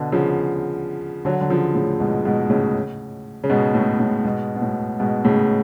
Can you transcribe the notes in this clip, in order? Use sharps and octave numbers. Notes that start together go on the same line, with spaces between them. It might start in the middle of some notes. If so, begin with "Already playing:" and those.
Already playing: B2 D3
C#3 F3
D3 F#3
D3
C#3 F3
A2 C#3
G#2 B2
G#2 B2
A2 C#3
C#3
G#2 B2
A2
A2
G#2 B2
B2
A2
G#2 B2
A2 C#3